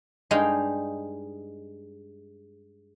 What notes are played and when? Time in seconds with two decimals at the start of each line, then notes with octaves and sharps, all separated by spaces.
0.31 G2 G#3 D#4 G#4 F5 G5